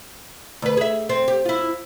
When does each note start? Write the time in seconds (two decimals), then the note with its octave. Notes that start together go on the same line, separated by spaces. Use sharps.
0.62 D2 B4
0.77 G#4 E5
1.09 C4
1.28 G4
1.45 E4 F4